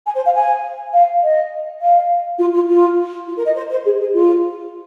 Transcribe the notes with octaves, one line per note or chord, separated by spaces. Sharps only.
G#5
C5
F5
G#5
F5
D#5
F5
F4
F4
F4
F4
A#4
D#5
C5
C5
G#4
G#4
F4